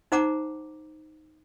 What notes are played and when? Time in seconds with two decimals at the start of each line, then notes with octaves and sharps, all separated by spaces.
0.12 D#4 C5 F#5 A#5 D6